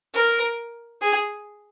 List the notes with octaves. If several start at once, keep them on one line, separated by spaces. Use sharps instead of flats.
A#4
G#4